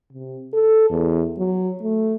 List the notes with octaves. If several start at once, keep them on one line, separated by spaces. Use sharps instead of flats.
C3
A4
E2
F#3
A3